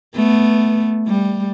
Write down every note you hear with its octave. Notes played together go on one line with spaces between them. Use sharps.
A3 B3
G3